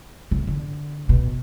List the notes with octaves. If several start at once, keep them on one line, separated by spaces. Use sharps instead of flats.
C#3
D3
B2